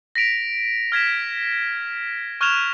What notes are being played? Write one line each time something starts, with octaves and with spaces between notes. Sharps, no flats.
A#6 B6 D7 F7
F6 G#6 B6 E7
C#6 F6 F#6 G#6 E7 F7